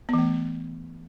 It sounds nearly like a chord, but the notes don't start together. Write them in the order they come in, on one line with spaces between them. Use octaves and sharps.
B3 E3 A3